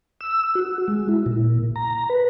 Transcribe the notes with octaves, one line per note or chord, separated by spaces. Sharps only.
E6
F#4
G#3
E4
A#2
A#5
B4